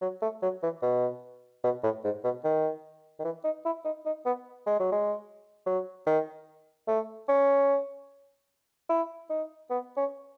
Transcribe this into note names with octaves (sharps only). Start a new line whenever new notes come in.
F#3
A3
F#3
E3
B2
B2
A2
G#2
B2
D#3
D#3
E3
D#4
E4
D#4
D#4
B3
G#3
F#3
G#3
F#3
D#3
A3
C#4
E4
D#4
B3
C#4